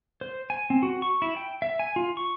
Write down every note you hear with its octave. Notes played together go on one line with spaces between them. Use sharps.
C5
G#5
C4
F#4
C#6
E4
G5
E5
G#5
F4
C#6